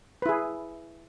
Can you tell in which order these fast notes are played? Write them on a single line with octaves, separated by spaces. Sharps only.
B4 E4 G#4